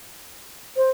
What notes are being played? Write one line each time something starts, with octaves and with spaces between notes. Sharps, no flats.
C5